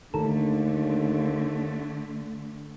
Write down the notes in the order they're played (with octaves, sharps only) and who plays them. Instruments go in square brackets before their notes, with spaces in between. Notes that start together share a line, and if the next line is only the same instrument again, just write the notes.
[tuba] D#2 [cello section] D3 A3 [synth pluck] D#3 A4